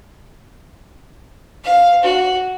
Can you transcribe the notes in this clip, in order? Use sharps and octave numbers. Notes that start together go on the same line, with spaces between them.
F5
F#4